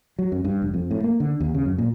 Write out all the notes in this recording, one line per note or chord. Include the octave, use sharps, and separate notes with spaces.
F#3
F#2
G2
F1
F2
A2
A#3
D3
D#2
C#3
F#2
A#2